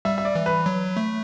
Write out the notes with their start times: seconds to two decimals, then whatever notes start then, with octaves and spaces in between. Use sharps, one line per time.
0.05 G3 E5
0.18 E5
0.25 D5
0.35 E3
0.46 B4
0.66 F#3
0.97 A3